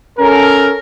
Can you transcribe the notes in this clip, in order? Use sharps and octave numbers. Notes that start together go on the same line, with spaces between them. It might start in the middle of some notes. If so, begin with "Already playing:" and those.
C#4 A4 A#4